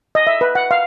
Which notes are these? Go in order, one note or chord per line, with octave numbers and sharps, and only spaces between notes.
D#5
E5
B4
F#5
F5